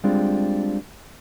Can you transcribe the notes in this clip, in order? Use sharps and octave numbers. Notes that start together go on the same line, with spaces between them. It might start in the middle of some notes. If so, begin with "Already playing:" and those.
G3 G#3 C4 D4 F4